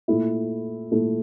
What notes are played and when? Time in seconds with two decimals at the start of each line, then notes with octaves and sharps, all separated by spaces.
0.08 A#2 A3 E4
0.92 A#2 A3 E4